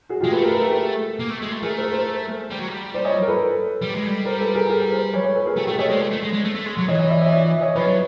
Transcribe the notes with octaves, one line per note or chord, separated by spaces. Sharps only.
F#4 G#4
G#3 F4 G4
A3 A4 B4
G#4 A#4
B4
G#4 A#4
G4 A4
A#3
A3
G#3
A3
A3 G#4 A#4
A#4 C5
A#4 C5
G3
F#3
G3
C5 D5
C#5 D#5
A#4
A4 B4
G3
G#3
G3
A#4 C5
A4 B4
G#4 A#4
G#4 A#4
A#4 C5
B4 C#5
B4 C#5
A4 B4
G#4 A#4
A3 G4 A4
A3 G4 A4
A3 C#5 D#5
G#3 C5 D5
A3
A3
G#3
G#3
A3
A3
G#3
F#3
E3 C#5 D#5
C#5 D#5
D5 E5
C#5 D#5
D5 E5
C#5 D#5
F3 B4 C#5
F#3